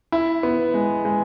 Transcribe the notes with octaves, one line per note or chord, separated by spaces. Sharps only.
E4
B3
G#3
G#3